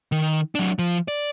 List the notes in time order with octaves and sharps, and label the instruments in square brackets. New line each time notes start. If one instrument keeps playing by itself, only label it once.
[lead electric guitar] D#3
F#3 D4
F3
D5